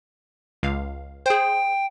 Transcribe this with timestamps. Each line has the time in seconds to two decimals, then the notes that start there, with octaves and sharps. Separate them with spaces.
0.63 C#2 F5
1.26 G#4 C5 G5